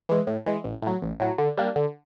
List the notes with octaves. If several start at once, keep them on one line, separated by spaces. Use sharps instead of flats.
E3 G#3
A2
E3 G#3
A1
A2 F#3
A1
A2 F#3
D3
G3 A#3 D4
D3